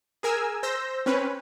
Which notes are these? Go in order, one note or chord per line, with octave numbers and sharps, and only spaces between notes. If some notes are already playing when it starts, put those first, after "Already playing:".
G#4 A#4 G#5 E6
C5 E6 G6 A#6
C4 C#4 B4